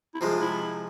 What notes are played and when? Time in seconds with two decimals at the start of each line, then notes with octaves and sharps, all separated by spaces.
0.14 E4
0.20 C3 F3 G#3 F4
0.41 E4